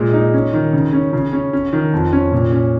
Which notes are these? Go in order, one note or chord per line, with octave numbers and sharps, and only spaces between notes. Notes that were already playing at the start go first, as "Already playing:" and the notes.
Already playing: A#2 G#3
D#4
C#4
D#3
C#3
C#4
C#3
C#4
C#4
D#3
F2
C#4
A#2
C#4